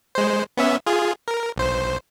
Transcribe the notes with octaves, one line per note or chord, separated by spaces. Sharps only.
G#3 C5
B3 C#4 E5
F4 G#4
A#4
B1 C5